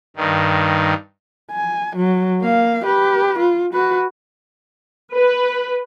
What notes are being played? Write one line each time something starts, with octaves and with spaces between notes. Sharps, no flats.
G2 D#3
G#5
F#3
A#3 F5
G4 B4
F4
F#4 B4
B4